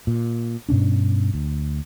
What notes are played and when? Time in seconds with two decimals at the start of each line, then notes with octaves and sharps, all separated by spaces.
0.07 A#2
0.69 G2 B2 C#4 D4
1.34 D2